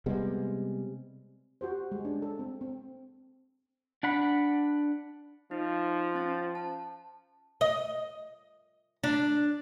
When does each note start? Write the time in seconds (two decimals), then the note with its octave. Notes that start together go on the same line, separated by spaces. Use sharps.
0.06 C3 G3 G#3 B3
1.61 F#4 G4 C5
1.92 G#3
2.05 C#4 D4
2.22 A4
2.39 C4
2.61 C4
4.03 D4 F#5 B5
5.51 F3 D#4
6.15 C#4 A6
6.55 A5
7.61 D#5
9.04 D4